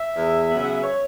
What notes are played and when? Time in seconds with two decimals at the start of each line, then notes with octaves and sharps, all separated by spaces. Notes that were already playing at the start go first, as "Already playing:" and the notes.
Already playing: E5
0.16 E2
0.49 C#3 F#3 B3
0.63 F#5
0.73 E5
0.84 C#5